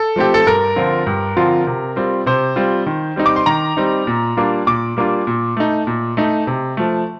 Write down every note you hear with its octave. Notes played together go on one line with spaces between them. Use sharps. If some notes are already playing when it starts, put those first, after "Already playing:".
Already playing: A4
F3 A3 C4 G4
A4
G2 A#4
D3 F3 C4 F4
G2
D3 F3 C4 F4
C3
G3 C4 F4
C3 C5
G3 C4 F4
D#3
G3 C4 D#4
D6
C6
D#3 A#5
G3 C4 D#4
A#2
G3 A#3 D4 F4
A#2 D6
G3 A#3 D4 F4
A#2
A3 D#4
A#2
A3 D#4
C3
F3 A3